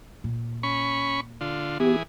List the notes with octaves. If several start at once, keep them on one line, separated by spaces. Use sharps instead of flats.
A#2
C#4 B5 C#6
D3 F4
E3 B3 G4 G#4